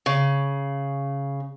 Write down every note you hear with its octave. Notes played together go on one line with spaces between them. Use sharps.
C#3